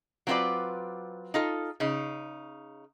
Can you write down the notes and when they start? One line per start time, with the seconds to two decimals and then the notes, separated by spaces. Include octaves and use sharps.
0.27 F#3 C4 F4 A4 B4 D5
1.34 D#4 F4 A4
1.80 C#3 D#4